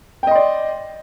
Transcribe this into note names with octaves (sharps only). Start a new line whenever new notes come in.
D5 D#5 G5 C6